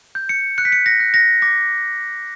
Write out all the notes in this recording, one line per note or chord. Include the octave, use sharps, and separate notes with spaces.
G6
C#7
F#6 C#7
B6
C#7
A#6
F#6
A#6
D6 A#6